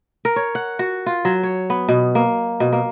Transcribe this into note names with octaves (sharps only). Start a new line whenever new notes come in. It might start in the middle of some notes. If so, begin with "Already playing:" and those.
A#4
C#5
F#5
F#4
F4
F#3
C#5
B3
B2
A#3
B2
A#3